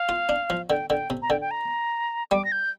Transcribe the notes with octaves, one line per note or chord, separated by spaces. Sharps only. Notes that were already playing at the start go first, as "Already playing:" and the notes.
Already playing: F5
F4
D4
F3
D3 G5
D3 G5
C3
A#5
D3 G5
G5
A#5
G3 D6
A#6
G6